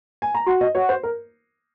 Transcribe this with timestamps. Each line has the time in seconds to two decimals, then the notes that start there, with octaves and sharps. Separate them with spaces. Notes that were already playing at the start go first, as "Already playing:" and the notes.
0.22 G#5
0.35 A#5
0.46 F#4 C6
0.61 D#5
0.75 F#4 C#5
0.89 C5
1.03 A#4